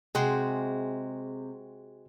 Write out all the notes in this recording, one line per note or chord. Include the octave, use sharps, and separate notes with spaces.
C3 G#3 F#4 G#4 G5 C6